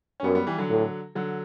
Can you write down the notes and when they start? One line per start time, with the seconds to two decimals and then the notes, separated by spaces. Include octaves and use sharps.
0.20 C#4
0.24 F#2 G3 B3
0.35 G3 B3
0.47 E3 G3
0.58 D3 F#3
0.70 A2
1.15 D3 F#3